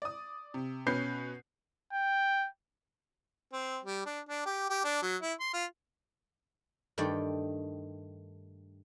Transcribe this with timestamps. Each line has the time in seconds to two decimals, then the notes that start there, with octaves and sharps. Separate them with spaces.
0.02 D5 D#6
0.54 C3
0.86 B2 C#4 B4 G6 C7
1.93 G5
3.53 C4
3.83 G3
4.06 D4
4.29 D4
4.46 G4
4.70 G4
4.85 D4
5.03 F#3
5.22 E4
5.40 C6
5.53 F4
6.98 G2 D#3 A3 D5 G5